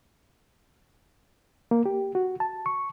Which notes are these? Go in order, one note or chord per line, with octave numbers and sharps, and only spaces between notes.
A#3
G4
F#4
A5
C#6